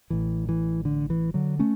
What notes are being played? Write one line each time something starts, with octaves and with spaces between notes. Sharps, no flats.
A1 A2 E3
E3
D3
E3
D3 F#3
A3 C#4